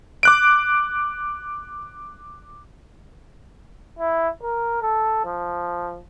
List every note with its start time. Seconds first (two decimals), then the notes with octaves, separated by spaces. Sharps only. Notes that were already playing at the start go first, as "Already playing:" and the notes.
0.23 D6 F#6 D7
3.99 E4
4.42 A#4
4.82 A4
5.25 F3